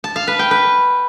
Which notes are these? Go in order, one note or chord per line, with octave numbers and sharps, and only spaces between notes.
A5
F5
B4
G5
B4